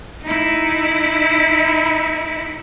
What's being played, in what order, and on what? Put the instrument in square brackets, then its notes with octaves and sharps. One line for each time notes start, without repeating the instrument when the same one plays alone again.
[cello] D#4 E4